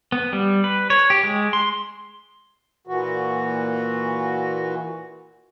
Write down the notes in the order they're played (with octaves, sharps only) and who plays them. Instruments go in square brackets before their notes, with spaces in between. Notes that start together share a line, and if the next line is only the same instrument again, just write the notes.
[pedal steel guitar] B3
G3
B4
C#5
G4
G#3
C6
[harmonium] A#2 E3 F#4